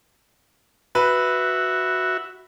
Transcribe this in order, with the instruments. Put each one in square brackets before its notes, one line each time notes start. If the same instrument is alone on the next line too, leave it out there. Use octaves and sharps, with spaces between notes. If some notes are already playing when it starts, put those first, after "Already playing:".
[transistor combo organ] F#4 E5 [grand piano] B4